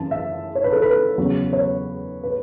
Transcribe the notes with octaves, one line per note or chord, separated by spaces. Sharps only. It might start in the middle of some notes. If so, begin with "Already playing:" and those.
Already playing: F#2 E3 A5
E5
C#5
B4
A4
B4
E2 C#3 F#3
C#5
B4